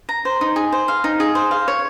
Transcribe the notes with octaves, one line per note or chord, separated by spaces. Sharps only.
A#5
C5
D#4
G#4
C5
F5
D#4
G#4
C5
F5
C#5